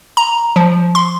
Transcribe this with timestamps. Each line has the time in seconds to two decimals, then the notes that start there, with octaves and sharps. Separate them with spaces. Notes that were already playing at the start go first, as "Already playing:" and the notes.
0.17 A#5
0.56 F3
0.95 C6